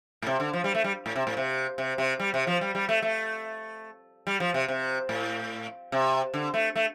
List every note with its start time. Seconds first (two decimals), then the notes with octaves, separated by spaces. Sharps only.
0.22 A2
0.26 C3
0.40 D3
0.53 F3
0.64 G3
0.75 A3
0.84 G3
1.06 A2
1.16 C3
1.27 A2
1.37 C3
1.78 C3
1.98 C3
2.20 G3
2.34 C3
2.47 F3
2.61 G3
2.75 G3
2.89 A3
3.02 A3
4.27 G3
4.40 F3
4.54 C3
4.68 C3
5.09 A2
5.92 C3
6.34 D3
6.54 A3
6.76 A3